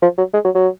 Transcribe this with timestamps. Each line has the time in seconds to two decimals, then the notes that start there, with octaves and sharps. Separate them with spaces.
0.02 F3
0.18 F#3
0.34 G#3
0.45 F#3
0.55 F#3